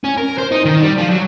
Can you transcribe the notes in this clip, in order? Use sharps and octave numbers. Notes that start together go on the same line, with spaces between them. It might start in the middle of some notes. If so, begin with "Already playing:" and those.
C#4
A#4
C5
D#4
D#3
G3
F3
F#3